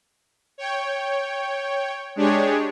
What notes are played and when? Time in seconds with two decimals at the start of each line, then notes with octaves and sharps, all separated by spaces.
0.58 C#5 G5
2.16 G#3 D4 G4 G#4 C#5